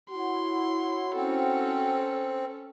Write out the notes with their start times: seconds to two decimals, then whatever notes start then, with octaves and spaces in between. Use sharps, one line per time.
0.11 E4 F#4 C#5 F#5 C6
1.16 C4 C#4 A4